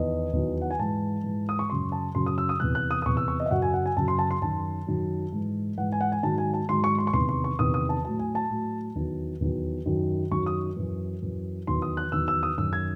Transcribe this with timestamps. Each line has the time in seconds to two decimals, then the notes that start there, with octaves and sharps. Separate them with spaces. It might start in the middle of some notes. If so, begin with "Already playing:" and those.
Already playing: E2 D#3 D#5
0.33 E2 D#3 F#3
0.62 F#5
0.71 G#5
0.79 G#2 E3 A5
1.24 G#2 E3
1.49 D#6
1.59 C#6
1.70 F#2 C#3 F#3 C6
1.92 A5
2.15 F#2 C#3 F#3 C6
2.26 D#6
2.38 E6
2.49 D#6
2.60 E2 C3 E3 F#6
2.75 F#6
2.91 D#6
3.02 D#6
3.06 E2 C3 E3 C#6
3.17 E6
3.28 C#6
3.40 D#5
3.46 E5
3.51 F#2 C#3 F#3 F#5
3.62 G#5
3.74 F#5
3.86 G#5
3.96 F#2 C#3 F#3 A5
4.08 C6
4.19 A5
4.31 C6
4.42 F#2 D#3 F#3 A5
4.87 F#2 D#3 F#3
5.32 G#2 E3
5.78 G#2 E3 F#5
5.92 G#5
6.01 F#5
6.12 G#5
6.23 G#2 D#3 F#3 A5
6.38 G#5
6.54 A5
6.68 G#2 D#3 F#3 C6
6.84 C#6
6.98 C6
7.07 C#6
7.13 E2 C3 D#3 C6
7.29 C6
7.44 C#6
7.59 E2 C3 D#3 D#6
7.74 D#6
7.89 A5
8.05 A2 F#3 A5
8.19 G#5
8.35 A5
8.50 A2 F#3
8.95 E2 D#3 F#3
9.41 E2 D#3 F#3
9.85 F#2 D#3 F#3
10.31 F#2 D#3 F#3 C#6
10.46 D#6
10.76 F#2 E3
11.22 F#2 E3
11.67 E2 D#3 F#3 C6
11.82 D#6
11.97 F#6
12.12 E2 D#3 F#3 E6
12.28 E6
12.43 D#6
12.58 F#2 D#3 F#3 E6
12.73 G#6